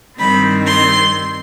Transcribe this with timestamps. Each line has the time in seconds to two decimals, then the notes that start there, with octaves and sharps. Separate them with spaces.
0.19 G2 D#3 G3 C4 B5
0.66 C6